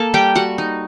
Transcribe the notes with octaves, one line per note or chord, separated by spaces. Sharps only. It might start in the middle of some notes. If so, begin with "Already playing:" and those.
Already playing: A#3 A4 A5
G3 G4 G5
G3 F#4 F#5
D#4